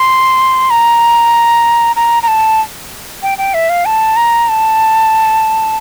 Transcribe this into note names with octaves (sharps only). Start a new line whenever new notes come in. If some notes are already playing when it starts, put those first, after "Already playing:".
Already playing: C6
A#5
A#5
A#5
A5
G5
G5
E5
F5
A5
A#5
A5